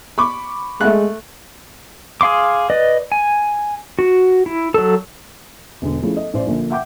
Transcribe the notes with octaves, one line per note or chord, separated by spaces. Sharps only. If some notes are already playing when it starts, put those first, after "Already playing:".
B5 C#6 D6
G#3 A3 F#6
G#4 F5 C6 D6
B4 D5 D#5
G#5
F#4
E4
F#3 A4
E1 D3
F3 A3 C#4 E4 G#4
A4 D#5
A1 C5 D5
A#1 A#2 D3
E5 F#5 G5 D6 G6